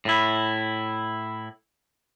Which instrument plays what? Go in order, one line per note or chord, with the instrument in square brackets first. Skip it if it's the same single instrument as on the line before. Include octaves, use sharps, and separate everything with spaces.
[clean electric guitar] A2 E4